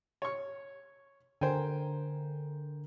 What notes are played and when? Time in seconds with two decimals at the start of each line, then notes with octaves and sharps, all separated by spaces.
0.22 C#5 C#6
1.41 D3 A#4 C5 G5 G#5